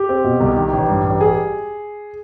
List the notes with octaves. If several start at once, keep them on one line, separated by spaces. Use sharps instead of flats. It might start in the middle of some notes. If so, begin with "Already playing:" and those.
Already playing: G4
C4
B2
C2
D#3
A1
G2
A1
G3 G#4